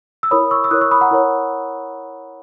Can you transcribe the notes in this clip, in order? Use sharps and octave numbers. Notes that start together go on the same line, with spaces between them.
E6
E4 A#4 C#5 B5 D#6
C#6 E6
E6
E4 A#4 C#5 D#6 F#6
C#6 E6
B5 D#6
F#5 A#5
E4 A#4 C#5